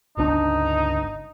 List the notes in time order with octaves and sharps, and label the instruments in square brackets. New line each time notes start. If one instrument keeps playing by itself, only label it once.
[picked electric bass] G1 C#2 D4 [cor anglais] D#4